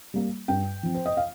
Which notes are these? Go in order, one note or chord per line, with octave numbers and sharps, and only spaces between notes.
G3 A#3
G2 G5
F3 C4
C5
D#5
F5